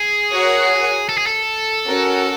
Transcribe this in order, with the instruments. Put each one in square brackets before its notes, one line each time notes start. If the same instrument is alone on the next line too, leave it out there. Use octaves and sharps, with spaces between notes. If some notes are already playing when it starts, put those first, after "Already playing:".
Already playing: [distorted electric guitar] G#4
[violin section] F#4 A#4 C#5 F#5
[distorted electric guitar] A4
G#4
A4
[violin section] C#4 F#4 A#4